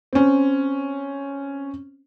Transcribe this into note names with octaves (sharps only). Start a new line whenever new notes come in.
C4 C#4